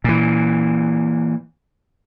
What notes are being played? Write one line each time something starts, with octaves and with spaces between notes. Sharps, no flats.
A#2 E3